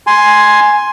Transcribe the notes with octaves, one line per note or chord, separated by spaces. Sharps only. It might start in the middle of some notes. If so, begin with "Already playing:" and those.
G#5 C6